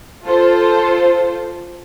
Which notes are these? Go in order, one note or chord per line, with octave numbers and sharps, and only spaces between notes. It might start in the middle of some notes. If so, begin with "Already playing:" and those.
F4 A4 C5